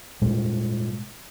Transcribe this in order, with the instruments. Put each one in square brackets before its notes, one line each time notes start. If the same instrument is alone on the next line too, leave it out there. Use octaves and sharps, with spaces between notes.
[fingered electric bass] A#2 G3 G#3